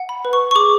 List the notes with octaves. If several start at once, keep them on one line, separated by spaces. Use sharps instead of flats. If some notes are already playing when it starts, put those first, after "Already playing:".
Already playing: F#5
B5
B4
C#6
C#6
G#4 D6